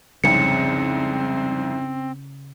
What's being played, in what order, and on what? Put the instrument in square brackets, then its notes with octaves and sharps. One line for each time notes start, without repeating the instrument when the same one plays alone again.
[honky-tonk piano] C2 F2 G#2 [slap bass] C#3 [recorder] C4 [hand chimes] C#7